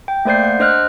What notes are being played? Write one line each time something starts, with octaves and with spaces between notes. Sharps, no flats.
G5
A3 A#3 C5 D5 G6 C7
F#5
D4 C5 D#5 F6 F#6